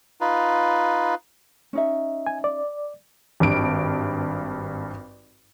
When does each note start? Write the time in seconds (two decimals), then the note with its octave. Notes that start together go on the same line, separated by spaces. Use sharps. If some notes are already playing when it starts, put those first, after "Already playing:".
0.21 D#4 F4 B4
1.73 C#4 D#4 E5
2.27 G#5
2.44 D5
3.40 G#1 G2 D7